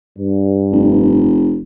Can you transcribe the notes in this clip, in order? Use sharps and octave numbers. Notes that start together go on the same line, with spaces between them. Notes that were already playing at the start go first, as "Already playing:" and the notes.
G2
F1